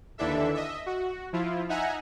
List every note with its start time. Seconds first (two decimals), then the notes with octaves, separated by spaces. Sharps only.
0.18 D#2 D3 E3 D4 A4 E5
0.55 D#5 E5
0.86 F#4
1.33 F3 E4 F4
1.69 D#4 E5 F#5 G#5 A#5